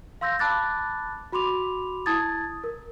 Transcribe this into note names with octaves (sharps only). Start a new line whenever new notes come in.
F5 C6 E6 G6 A#6
A5 B5 D6 F#6 A6
F#4 B5 C6 D6 F7
E4 A5 D#6 G#6 A6
A#4